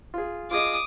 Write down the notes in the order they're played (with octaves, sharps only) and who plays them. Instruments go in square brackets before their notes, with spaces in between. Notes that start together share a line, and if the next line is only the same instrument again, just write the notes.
[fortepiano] F4 G#4
[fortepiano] F4 G#4 D#5 [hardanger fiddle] D6 D#6